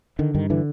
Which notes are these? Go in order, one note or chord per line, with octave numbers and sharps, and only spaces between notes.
D3 D#3
G2 D#3
D3 E3